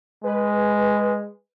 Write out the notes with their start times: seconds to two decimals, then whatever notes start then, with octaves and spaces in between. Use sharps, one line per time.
0.24 G#3 B4